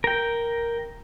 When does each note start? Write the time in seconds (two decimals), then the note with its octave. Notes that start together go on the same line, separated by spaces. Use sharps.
0.04 A#4 G5